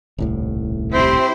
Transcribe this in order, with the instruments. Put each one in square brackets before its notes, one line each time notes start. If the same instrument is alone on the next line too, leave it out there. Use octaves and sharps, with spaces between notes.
[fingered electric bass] D#1 C2 A2
[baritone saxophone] C4 [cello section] E4 G4 C5